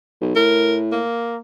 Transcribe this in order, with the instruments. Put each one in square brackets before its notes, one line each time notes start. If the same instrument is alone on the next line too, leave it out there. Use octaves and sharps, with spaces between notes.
[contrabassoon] B1
[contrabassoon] A2 [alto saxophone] A#4
[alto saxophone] A#3